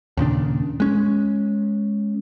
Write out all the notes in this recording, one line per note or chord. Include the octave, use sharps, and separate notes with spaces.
D#2 A#2 C#3 D4
G#3 C#4